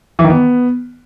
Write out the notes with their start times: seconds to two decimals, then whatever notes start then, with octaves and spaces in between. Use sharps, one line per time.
0.19 E3
0.24 D#3
0.30 B3